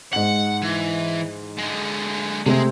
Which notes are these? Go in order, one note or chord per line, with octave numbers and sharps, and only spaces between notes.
G#2 F#5 F#7
E3
D3 G#3
C3 G#3 A3 C4